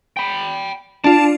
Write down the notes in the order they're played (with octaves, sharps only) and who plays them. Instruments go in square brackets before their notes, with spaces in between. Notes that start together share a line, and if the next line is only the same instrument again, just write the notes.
[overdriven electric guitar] G5 B5
[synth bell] D4 F4 [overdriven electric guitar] A5